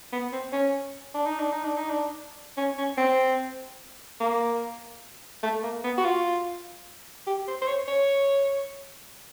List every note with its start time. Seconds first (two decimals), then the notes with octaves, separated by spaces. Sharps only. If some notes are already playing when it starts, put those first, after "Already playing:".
0.13 B3
0.33 C4
0.53 C#4
1.14 D4
1.27 D#4
1.40 D4
1.52 D#4
1.65 D4
1.77 D#4
1.90 D4
2.57 C#4
2.78 C#4
2.98 C4
4.20 A#3
5.43 A3
5.63 A#3
5.84 B3
5.98 F#4
6.04 F4
7.27 G4
7.48 C5
7.62 C5
7.68 C#5
7.88 C#5